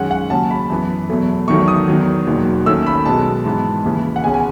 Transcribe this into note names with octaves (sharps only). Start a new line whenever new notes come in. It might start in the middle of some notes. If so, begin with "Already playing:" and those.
Already playing: F#2 D#3 G#3 C#4 F#5
F#5
D#2 C#3 F#3 C#4 A5
B5
F#2 E3 B3
E2 B2 F#3 A3
E2 D#3 F#3 A3 C#6
D#6
E2 D#3 F#3
E1 D#2 D#3 F#3
D#2 D#3 A3 C#4 E6
B5
B1 B2 G#3 B3 A5
G#2 E3 B3
D#2 C#3 E3
F#5
C#2 B2 G#3 C#4 G#5
G#5